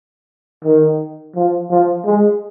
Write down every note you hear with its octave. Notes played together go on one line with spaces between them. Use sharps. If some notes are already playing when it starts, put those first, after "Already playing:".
D#3
F3
F3
G#3